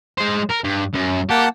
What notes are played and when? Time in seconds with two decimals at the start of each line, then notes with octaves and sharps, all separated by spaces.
0.18 G#3 C5
0.49 A#4
0.64 G2
0.95 F#2
1.30 A#3 G4 F#5 A5